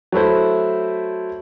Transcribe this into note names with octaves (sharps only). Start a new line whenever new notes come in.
F#3 A3 E4 C5